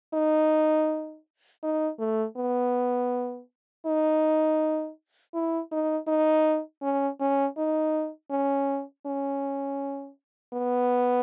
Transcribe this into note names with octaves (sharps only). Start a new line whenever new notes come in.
D#4
D#4
A3
B3
D#4
E4
D#4
D#4
C#4
C#4
D#4
C#4
C#4
B3